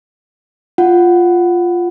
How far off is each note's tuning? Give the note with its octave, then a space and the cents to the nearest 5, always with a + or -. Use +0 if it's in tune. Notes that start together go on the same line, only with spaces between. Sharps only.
F4 +0 F#5 +5